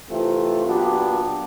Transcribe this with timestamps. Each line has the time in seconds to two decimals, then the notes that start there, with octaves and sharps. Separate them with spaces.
0.09 C3 E3 A3 C4 F4
0.66 A#2 F#3 B3 D4 G4